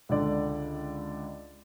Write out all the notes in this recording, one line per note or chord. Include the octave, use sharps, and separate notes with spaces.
C#2 D3 D5